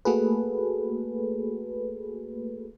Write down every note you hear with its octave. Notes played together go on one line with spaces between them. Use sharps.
A3 A#3 F#4 G#4 A4 B4